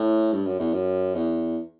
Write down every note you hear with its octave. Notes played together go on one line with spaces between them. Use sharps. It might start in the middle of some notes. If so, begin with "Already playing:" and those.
Already playing: A2
G2
F#2
E2
F#2
E2